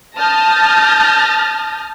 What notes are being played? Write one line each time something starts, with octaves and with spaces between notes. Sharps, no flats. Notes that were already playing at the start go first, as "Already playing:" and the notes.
A5 D#6 F6 G6 A6 A#6